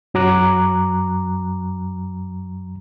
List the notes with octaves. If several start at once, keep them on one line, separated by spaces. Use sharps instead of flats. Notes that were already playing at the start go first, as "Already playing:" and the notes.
F#2 F#3 A#5 D6 F#6